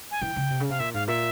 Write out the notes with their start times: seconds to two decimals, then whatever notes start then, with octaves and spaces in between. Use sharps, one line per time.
0.11 G#5
0.21 E3 G5
0.36 C#3
0.50 C3
0.60 C#3
0.69 C3 F5
0.80 A#2 E5
0.94 G#2 F5
1.07 A#2 E5